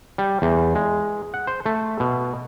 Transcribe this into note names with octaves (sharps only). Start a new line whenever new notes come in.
G3
E2
G#3
F#5
C5
A3
B2